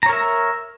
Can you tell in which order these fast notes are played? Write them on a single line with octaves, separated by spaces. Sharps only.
A#5 C#5 A#4 E5